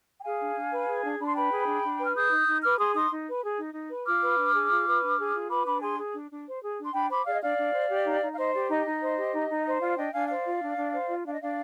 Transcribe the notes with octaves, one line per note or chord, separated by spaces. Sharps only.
G5
G#4 F5 G#5
D4
D4
B4
G#4
D4
D4 B5
C6
B4 G5 B5
G#4
D4
D4
B4
F6
G#4 D#6 G6
D#4
D#4
B4 D6 F6
G#4 C6 D#6
D#4 C6 D#6
D#4
B4
G#4
D#4
D#4
B4
F4 D6 F6
B4
D4
G#4
F4
B4
D4
G#4
F4
B4 B5 D6
D4 B5 D6
G#4 G#5 C6
G#4
D4
D4
C5
G#4
D4
C6
D4 G5 B5
C5 B5 D6
G#4 D5 F5
D#5
D4 D5 F5
D4
C5
G4
D#4
D#4
F5
C5 D#5
G4 D5
D#4 D#5
D#4
C5
G4
D#4
D#4
C5
F4 D5 F5
D4 D#5 G5
D4 F5 G#5
C5 D5 F5
F4
D4
D4
C5
F4
D4 F5
D#5
D4 D5 F5